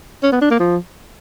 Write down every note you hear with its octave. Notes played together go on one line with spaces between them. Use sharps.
C#4
B3
D4
A#3
F3